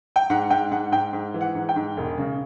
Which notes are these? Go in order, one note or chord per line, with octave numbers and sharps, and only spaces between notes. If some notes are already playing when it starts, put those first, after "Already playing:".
G5
G#2 F#5
G#2 G5
G#2 F#5
G#2 G5
G#2
E3
F#5
G#2
G5
G#2
E1
C#3